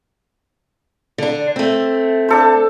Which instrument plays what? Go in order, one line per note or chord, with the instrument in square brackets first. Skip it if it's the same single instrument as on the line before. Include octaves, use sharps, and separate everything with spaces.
[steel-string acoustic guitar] D3 D4
A3 C4
[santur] D4 A4 C5